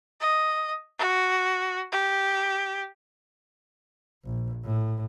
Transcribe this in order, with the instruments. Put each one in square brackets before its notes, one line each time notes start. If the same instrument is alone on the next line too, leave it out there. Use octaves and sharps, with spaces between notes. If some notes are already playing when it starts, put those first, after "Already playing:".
[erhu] D#5
F#4
G4
[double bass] A#1
A2